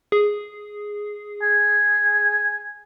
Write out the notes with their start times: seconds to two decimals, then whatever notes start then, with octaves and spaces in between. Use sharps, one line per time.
0.12 G#4
1.43 G#5